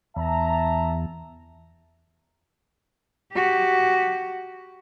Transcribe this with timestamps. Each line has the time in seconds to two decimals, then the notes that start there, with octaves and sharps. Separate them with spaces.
0.16 E2 E5 A5 A#5
3.34 F#4 G4